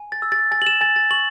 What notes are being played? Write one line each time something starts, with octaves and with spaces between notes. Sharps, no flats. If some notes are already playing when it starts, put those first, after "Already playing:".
Already playing: G#5
A6
E6
A6
G#5 A6
F#7
E7
G#5 A6
A6
C#6 F#7